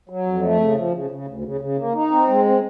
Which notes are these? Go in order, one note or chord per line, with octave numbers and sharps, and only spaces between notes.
F#3
F2
A3
C#3
F3
C#3
C#3
D2
C#3
C#3
A#3
D#4
C4
G#3
C4